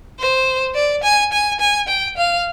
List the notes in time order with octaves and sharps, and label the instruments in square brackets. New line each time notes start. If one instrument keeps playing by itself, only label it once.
[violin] C5
D5
G#5
G#5
G#5
G5
F5